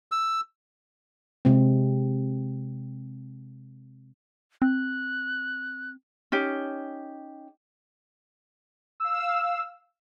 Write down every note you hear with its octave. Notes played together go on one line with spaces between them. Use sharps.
E6
C3 G#3 C4
C4 F#6
C#4 D#4 G4
F5 E6